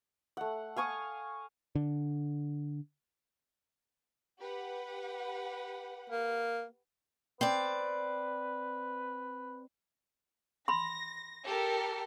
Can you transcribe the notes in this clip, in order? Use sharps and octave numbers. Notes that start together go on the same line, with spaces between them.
A3 F#5
F5 G#5 C#6 D#6
D3
G4 B4 F#5
A#3
C4 B4 D5
B5 C6 A#6
G4 A4 A#4